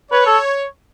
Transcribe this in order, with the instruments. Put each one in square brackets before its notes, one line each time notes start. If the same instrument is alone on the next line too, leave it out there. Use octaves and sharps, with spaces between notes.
[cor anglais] B4 [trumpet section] C#5
[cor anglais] A4